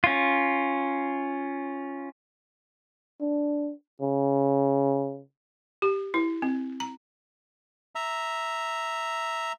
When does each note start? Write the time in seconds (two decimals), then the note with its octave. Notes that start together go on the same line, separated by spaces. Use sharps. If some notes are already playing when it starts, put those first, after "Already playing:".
0.04 C#4 F4
3.21 D4
4.01 C#3
5.82 G4
6.14 E4
6.42 C4
6.80 A#5
7.95 E5 A#5